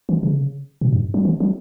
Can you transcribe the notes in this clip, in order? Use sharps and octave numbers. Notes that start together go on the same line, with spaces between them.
E3
C#3
B2
G2
F#3
E3
F#3